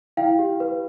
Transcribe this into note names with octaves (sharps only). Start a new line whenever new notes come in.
E4 F5 G5
G4
B4